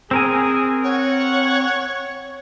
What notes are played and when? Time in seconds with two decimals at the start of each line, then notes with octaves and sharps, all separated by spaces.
0.11 C4 G#4 A#4 G#5
0.84 C#5 F#5